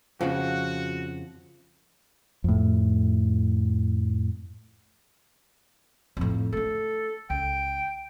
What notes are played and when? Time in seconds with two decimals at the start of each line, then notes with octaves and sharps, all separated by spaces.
0.21 F2 C#3 F3 F#4
2.44 F2 A2
6.17 F2 A2
6.52 A3 D4 A4
7.30 C#2 G5